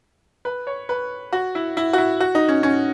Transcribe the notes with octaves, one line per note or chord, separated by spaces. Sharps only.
B4
C#5
B4
F#4
E4
E4
F#4
E4
F#4
D#4
C#4
C#4